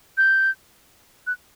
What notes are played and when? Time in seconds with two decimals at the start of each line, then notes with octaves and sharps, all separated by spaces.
0.18 G6
1.27 F#6